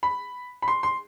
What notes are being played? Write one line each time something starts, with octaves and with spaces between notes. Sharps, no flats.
B5
B5
C6
C6